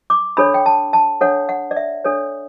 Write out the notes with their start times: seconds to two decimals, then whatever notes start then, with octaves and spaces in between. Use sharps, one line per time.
0.10 D6
0.37 D4 A4 C#5 B5
0.54 G5
0.66 A5
0.93 A5
1.21 D4 A4 C#5 F#5
1.49 F#5
1.71 D5
1.76 E5
2.04 D4 A4 C#5